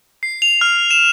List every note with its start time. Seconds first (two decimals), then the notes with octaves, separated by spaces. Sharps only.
0.23 C7
0.42 F7
0.61 F6
0.91 E7